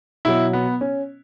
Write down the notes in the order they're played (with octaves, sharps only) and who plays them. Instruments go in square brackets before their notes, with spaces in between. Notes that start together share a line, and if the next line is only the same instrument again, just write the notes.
[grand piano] B2 F#3 E4
B3
C#4